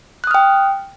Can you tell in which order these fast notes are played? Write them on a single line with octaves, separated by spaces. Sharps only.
F#6 D#6 F6 G5